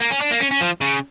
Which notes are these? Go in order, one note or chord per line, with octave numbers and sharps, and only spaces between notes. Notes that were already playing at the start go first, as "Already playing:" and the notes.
A#3
C#4
D4
A#3
C#4
C#4
F3
C#3